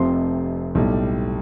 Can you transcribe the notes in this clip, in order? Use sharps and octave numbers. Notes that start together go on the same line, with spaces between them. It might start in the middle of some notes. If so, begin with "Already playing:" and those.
Already playing: F1 F2 C3 F3 C6
B1 A2 G3